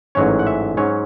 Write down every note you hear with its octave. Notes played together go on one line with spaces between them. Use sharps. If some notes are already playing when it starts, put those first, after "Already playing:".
A1 G#2 F#3 C#4 C#5
F#5
E5
G#2 F#3 C#4 C#5